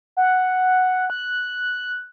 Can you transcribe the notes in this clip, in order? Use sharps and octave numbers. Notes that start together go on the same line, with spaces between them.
F#5
F#6